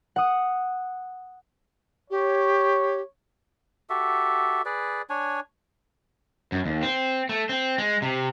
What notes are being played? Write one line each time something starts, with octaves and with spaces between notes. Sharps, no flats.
F#5 D#6
G4 C#5
F#4 G4 A4 E5
G#4 B4 D5
D4 C#5 G#5
F#2
D#2
C4
A3
C4
G#3
C3